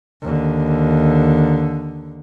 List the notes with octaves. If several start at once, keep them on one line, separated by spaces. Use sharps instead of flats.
D#2 D3